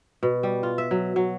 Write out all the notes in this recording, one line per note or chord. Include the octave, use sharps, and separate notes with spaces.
B2
G3
F4
E5
F#3
F#3